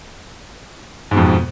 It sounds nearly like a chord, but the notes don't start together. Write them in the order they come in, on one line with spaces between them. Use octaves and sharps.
G#2 B2 F2